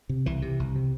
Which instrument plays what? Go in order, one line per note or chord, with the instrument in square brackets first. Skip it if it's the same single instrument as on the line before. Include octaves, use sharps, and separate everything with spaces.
[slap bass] C3
C2 E3
C3
C2
C3